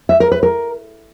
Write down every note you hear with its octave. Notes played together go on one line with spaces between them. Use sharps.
E5
A#4
B4
A#4